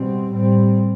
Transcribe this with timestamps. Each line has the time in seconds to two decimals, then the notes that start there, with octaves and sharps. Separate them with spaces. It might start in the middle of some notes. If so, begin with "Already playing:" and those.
Already playing: B2 G3 C4
0.31 A2 G3 C4